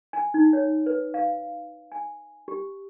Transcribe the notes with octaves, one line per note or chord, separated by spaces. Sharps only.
G#5
D#4
C#5
B4
F5
G#5
G4